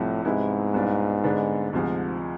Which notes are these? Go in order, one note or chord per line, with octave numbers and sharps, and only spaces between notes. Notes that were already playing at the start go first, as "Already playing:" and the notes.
Already playing: C2 A2 C3 F3
G#2 C3 G#3 B3 E4
C2 B2 B3 D4 F4
D3 G#3 B3 D4
D2 G#2 C3 F3 G#3